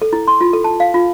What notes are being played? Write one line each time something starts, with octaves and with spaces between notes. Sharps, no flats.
A4
E4
C6
F4
A4
A5
F5
F4